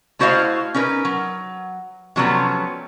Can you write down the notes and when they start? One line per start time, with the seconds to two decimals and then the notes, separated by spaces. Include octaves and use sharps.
0.19 A3 E4 F#4 C5 D#5 F5
0.74 C#4 D#4 A#4 B4
1.05 F#3
2.16 C3 F3 F#3 A3 B3 C#4